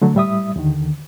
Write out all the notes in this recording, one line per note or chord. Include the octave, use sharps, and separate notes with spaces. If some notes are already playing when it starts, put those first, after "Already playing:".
D3 F#3 A3
A2 G3 E5 D#6
D#2 D3 D#3